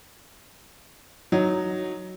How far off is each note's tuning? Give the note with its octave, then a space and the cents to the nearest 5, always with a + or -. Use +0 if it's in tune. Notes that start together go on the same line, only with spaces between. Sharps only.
F#3 +0 D#4 +0